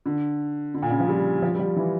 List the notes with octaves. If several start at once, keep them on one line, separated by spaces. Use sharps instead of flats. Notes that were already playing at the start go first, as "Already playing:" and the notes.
D3
D3
A#2
C#3
F3
G3
F3
G3
F3
E3